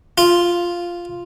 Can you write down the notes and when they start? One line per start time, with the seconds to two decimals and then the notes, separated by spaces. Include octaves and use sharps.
0.18 F4